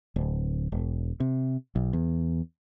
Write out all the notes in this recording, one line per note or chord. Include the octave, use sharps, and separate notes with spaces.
D1
E1
C3
B1
E2